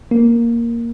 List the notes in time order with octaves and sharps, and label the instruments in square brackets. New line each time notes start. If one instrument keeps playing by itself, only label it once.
[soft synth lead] A#3